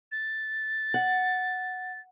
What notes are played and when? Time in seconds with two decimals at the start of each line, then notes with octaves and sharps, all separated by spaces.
0.12 A6
0.94 F#5